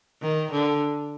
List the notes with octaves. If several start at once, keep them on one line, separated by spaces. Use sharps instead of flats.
D#3
D3